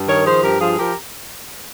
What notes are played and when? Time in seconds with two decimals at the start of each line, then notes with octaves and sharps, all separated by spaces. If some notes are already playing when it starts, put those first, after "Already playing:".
Already playing: G2
0.08 D#3 A#4 C#5
0.26 F3 G#4 C5
0.43 G2 G4 A#4
0.61 F3 F4 G#4
0.79 F3 G4 A#4